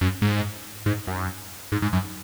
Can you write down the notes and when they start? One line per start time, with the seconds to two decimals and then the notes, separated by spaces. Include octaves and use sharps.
0.01 F#2
0.22 G#2
0.86 G#2
1.07 F#2
1.72 G#2
1.82 G#2
1.93 F#2